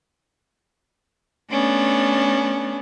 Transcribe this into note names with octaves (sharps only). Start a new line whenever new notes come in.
A3 B3 C#4 D4